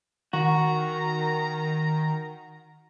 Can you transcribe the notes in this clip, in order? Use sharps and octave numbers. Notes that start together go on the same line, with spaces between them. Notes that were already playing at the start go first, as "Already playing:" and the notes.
D#3 F#4 A#5